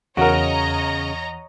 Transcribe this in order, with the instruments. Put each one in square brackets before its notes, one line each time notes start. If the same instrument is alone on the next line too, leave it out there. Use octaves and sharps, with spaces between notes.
[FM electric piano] E2 [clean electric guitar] C#3 [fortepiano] F#4 A#4 [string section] C#5 D#5 A#5